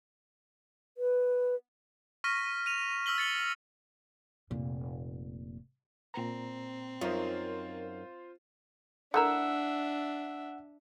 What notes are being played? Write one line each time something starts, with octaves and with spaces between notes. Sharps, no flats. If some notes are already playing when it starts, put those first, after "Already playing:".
B4
C#6 F6 A#6 B6 D#7
D#7 F7
E6 F6 B6 F#7 G7
A6 C#7 F#7 G7
F1 A#2
A#2 C4 A#5
F#2 D#4 F4 A#4 C5 C#5
A3 D4 E4 A#4 E5 F#5 E6